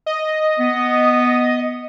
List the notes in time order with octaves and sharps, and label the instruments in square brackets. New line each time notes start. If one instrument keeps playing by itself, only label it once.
[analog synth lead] D#5
[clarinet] B3